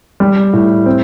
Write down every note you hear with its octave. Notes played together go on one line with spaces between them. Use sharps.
G3
A2
C4